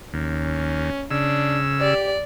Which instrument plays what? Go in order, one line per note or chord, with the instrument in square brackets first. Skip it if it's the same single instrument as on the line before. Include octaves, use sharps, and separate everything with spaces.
[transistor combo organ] D#2 [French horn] C#4
[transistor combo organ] C#3 E6 [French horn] D4
[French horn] G4 [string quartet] D5